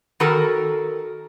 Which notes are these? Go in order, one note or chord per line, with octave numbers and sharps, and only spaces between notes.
D#3 F#4 A4 A#4